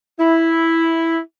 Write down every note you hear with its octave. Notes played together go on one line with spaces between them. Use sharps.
E4